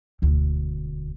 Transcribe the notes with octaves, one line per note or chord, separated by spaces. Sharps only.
E1 D2